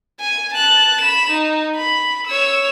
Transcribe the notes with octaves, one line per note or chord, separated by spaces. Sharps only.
G#5
A5 F#6
B5 E7
D#4
B5
C#5 E6